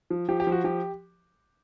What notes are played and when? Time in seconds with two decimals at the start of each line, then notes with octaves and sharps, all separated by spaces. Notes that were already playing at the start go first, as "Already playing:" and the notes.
0.10 F3
0.28 F3 G4
0.40 G4
0.47 F3
0.52 F#4
0.64 F3 G4